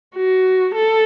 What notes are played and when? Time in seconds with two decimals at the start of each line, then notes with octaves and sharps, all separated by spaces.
0.16 F#4
0.75 A4